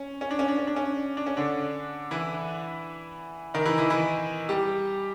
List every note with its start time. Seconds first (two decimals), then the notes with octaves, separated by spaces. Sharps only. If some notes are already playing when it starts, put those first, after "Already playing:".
Already playing: C#4
0.21 C#4
0.31 D4
0.39 C#4
0.48 D4
0.58 C#4
0.67 D4
0.76 C#4
1.17 D4
1.26 C#4
1.37 D3 D4
2.11 E3 E4
3.54 D#3 D#4
3.66 E3 E4
3.78 E3 E4
3.90 E3 E4
4.49 G3 G4